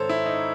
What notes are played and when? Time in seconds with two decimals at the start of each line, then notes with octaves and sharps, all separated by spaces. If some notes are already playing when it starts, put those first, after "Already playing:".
Already playing: G#2 D#3 A4 C5 C#5
0.09 E4
0.26 D#4